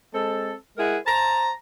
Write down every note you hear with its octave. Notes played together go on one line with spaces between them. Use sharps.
G#3 C4 A4
G#3 E4 G#4 A#4 F#5
C5 A5 A#5